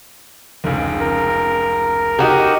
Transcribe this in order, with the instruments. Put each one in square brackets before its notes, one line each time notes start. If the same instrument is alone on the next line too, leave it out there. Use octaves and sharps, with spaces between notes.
[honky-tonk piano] F1 C#2
[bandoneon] A#4
[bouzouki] D#4 F#4 A#4 [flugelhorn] G4